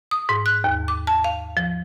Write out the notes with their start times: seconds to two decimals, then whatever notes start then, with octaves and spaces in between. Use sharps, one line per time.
0.11 D#6
0.29 G#2
0.46 F#6
0.64 D#2
0.88 D6
1.07 A5
1.24 F5
1.57 F3